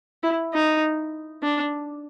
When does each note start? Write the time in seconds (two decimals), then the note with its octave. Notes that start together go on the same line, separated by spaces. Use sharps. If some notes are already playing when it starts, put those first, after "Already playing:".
0.23 E4
0.53 D#4
1.43 D4